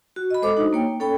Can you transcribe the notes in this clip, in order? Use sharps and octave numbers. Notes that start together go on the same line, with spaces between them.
F#4
D#5 B5
G#3 A4 C5 D#5 D6
D4 D#4 F#4
A#3 C#5 G5
C#4 A4 C#5 G5 B5